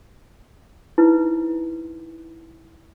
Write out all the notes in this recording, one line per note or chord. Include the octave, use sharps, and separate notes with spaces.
D#4 E4 B4 C5